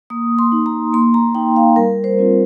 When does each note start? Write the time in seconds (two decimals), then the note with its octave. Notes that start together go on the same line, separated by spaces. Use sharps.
0.10 A#3 D#6
0.39 C6
0.52 D#4
0.66 A#5
0.93 A#3 C6
1.14 A#5
1.35 D#4 G5
1.56 F5
1.76 G3 A#4
2.04 C5
2.18 C4 F4